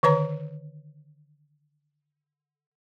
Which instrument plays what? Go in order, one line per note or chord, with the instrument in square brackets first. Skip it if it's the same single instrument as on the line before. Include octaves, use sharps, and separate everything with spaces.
[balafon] D3 D#3 B4 C#5 A#5